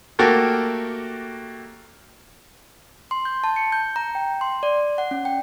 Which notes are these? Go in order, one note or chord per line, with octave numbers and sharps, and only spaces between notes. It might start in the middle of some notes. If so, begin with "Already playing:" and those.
A3 A#3 F#4 G4 A4 A#4
C6
G6
A5
C#7
G6
A#5
G5
C6
D5
F#5
C#4
G5